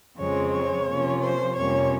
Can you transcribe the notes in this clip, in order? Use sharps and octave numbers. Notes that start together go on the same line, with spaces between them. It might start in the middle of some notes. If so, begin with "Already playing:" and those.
F2 C#3 G#3 C4 C#5
C#5
C3 F3 A#3 C#4
C5
F2 C3 G3 A#3 C#4 C#5